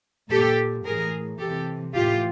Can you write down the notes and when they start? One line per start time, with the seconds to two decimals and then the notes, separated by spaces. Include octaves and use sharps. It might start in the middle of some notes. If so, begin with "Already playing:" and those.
0.30 A#2 G4 A4
0.85 A2 E3 G#4 A#4
1.39 C3 E3 G4 A4
1.94 A2 E3 F4 G4